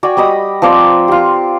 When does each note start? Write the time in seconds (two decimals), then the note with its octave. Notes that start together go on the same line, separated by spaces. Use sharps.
0.03 F#4 D5 G5 G#5
0.17 G3 D#5 B5 D#6
0.62 F3 C4 D5 A#5
1.08 F4 G4